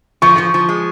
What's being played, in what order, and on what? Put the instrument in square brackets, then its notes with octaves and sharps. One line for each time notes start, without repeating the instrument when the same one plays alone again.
[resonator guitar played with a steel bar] F3 [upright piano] C#6
[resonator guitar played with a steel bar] F3
F3
G#3